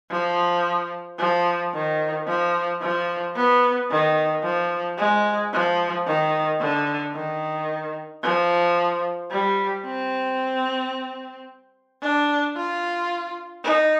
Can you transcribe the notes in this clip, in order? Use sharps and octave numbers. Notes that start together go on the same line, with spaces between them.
F3
F3
D#3
F3
F3
B3
D#3
F3
G#3
F3
D#3
D3
D#3
F3
G3
C4
D4
F4
D#4